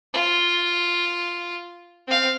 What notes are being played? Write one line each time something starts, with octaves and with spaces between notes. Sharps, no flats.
F4
C4 F5